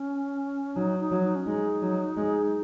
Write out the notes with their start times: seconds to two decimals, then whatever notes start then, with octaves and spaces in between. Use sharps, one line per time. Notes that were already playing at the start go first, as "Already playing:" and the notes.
Already playing: C#4
0.76 F#3 D#4
0.99 D#4
1.11 F#3
1.23 D#4
1.36 C#4
1.46 G#3 D#4
1.82 F#3
2.17 G#3